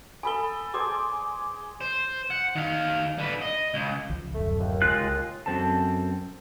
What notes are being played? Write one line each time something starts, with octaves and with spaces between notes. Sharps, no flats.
A4 G#5 B5 D#6 G7
G#4 C5 D5 D6
C5
F#5
D#3 F5
D3 B4
D#5
C#2
C#2 F3
D1 F#2 A3
D#2
C#2 G#3 F4 F#6
F#2 C4 A4 A5